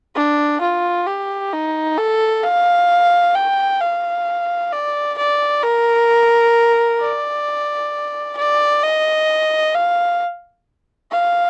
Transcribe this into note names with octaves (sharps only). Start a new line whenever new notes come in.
D4
F4
G4
D#4
A4
F5
G5
F5
D5
D5
A#4
D5
D5
D#5
F5
F5